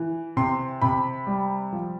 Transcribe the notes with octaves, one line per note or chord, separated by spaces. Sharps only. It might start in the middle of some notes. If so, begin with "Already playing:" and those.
Already playing: E3
C3 C6
C3 B5
G3
F3